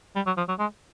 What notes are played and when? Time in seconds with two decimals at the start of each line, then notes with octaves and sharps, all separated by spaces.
0.16 G3
0.26 F#3
0.37 F3
0.49 F#3
0.59 G#3